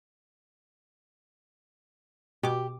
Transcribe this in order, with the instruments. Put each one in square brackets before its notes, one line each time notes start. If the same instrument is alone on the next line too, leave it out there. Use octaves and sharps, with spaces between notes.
[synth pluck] B2 D6 [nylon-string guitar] G4